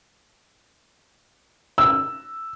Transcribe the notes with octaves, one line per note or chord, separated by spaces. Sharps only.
E6